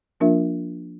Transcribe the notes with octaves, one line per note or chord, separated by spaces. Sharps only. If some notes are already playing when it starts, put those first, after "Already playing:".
F3 A#3 D4 F4 A#4 E5